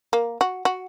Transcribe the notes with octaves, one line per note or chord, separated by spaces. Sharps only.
A#3
F#4
F#4